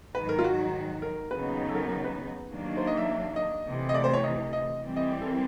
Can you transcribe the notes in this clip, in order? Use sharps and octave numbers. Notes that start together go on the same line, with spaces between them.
G#2 D#3 F#3 B4
A#4
F4
F#4
A#4
D#2 C#3 F#3 B3 D#4 B4
A4
A#4
A#4
B4
D#2 D#3 F#3 A#3 D4
C5
D#5
E5
D#5
D2 C3 E3
D#5
D5
C5
C#5
D#5
D#5
E3 G3 C4
D#5
D5
A4
A#4